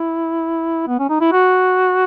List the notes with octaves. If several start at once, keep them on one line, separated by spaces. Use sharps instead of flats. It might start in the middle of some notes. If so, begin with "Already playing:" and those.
Already playing: E4
B3
C#4
D#4
E4
F#4